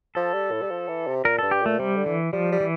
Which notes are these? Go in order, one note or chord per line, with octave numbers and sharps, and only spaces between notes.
F3 A4
G3
A2
G3
F3
E3
C3
A#2 A#4
G2 A4
G4
A#2 A3
C3 G3
D3
E3
F3 G3
G3
E3